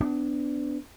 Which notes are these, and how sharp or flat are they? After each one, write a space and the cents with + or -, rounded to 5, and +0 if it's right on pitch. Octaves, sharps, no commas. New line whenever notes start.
B3 +35 D4 +0